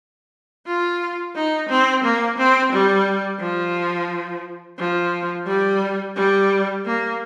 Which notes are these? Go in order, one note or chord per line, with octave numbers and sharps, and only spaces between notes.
F4
D#4
C4
A#3
C4
G3
F3
F3
G3
G3
A#3